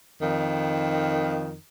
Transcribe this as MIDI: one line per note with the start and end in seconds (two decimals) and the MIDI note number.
0.21 1.56 41
0.21 1.56 51